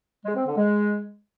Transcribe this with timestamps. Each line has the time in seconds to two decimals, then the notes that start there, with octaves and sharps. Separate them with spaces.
0.25 G#3
0.35 C4
0.46 D3
0.56 G#3